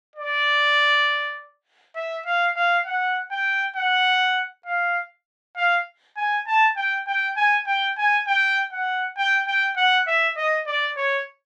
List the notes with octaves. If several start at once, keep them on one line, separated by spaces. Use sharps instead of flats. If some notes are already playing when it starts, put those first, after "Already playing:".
D5
E5
F5
F5
F#5
G5
F#5
F5
F5
G#5
A5
G5
G5
G#5
G5
G#5
G5
F#5
G5
G5
F#5
E5
D#5
D5
C#5